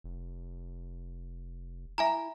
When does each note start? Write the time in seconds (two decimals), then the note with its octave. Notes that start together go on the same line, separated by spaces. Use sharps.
0.04 F1
1.98 E4 E5 G#5 A#5